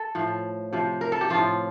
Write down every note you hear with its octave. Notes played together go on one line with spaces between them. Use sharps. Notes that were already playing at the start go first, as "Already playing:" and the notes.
Already playing: A4
A2 F3
C3 F3
A#4
A4
G4
A2 F3 F4